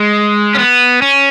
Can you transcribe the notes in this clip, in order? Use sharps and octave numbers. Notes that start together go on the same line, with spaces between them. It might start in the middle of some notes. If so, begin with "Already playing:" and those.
Already playing: G#3
C#4
B3
C#4